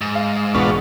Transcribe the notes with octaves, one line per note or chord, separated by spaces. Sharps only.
G#2
F5
E1 B3 D4 F4 F#5 C#6